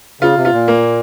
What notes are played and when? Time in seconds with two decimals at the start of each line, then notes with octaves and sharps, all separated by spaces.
0.21 C#3 F4
0.37 C3
0.45 F4
0.52 A#2
0.68 A#3